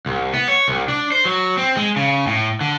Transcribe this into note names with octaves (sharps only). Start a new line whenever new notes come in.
C2
B3
C#5
C2
D4
C5
F#3
C4
G#3
C#3
A2
D3